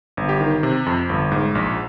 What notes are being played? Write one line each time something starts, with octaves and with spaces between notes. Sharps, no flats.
G1
G4
D#3
C3
F2
G1
G#2
A#1